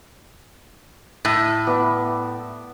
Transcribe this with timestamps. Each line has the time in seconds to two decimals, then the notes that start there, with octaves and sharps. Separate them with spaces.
1.25 A2
1.67 B3 D5 E5